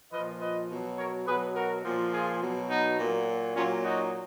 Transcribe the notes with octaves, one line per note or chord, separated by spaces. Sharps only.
A#2 F3 B4 D#5
B4 D#5
B2 F#3
A#4 C#5
B2 F#3 G#4 B4
F#4 A#4
A#2 F3
F4 G#4
B2 F#3
B3 D#4
A#2 F#3
A#2 F#3 C#4 F4
D#4 F#4